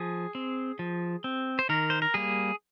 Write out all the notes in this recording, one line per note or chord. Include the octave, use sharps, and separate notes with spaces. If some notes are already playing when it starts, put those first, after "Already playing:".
Already playing: F3 G#4
C4
F3
C4
C5
D#3 A#4
C5
A#4
G3 A#3 G#4